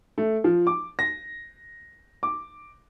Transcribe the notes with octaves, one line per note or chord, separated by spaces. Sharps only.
A3
F3
D6
A#6
D6